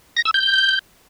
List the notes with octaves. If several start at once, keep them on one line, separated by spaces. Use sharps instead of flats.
A#6
E6
G6